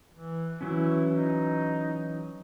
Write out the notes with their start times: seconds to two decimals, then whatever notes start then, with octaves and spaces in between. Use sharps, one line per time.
0.13 E3
0.61 E3 F#3 C#4 E4
1.15 D#4